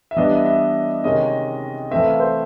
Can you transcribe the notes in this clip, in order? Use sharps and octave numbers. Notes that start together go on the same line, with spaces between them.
E5
E3 G3 B3 D4 D#5
E5
E5
C3 D#3 G#3 C#4 D#5
E3 A3 C4 E5
F5
C5